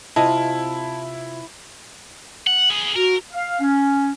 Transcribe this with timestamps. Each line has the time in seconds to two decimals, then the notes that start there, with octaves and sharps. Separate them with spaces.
0.16 C3 E4 F4 D#5 A5
2.47 F#5
2.70 B3 G#4
2.96 F#4 A#4
3.32 F5
3.60 C#4